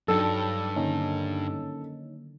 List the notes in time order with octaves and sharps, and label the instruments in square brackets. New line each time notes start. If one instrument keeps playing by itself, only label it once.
[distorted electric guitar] G2 [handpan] F#3 D4 D#4 [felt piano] A4
[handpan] D3 D#3 [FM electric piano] A#3 C#4 D#4